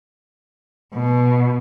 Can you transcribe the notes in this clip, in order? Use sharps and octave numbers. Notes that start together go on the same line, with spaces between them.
B2